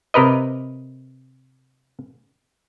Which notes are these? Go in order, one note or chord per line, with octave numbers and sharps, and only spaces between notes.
C3 A#4 B4 D#5